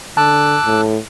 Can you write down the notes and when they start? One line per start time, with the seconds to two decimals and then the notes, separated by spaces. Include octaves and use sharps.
0.17 D3 A5 D6 E6 F#6
0.66 A2